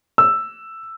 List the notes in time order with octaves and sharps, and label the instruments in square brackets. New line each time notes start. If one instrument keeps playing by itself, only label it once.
[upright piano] E6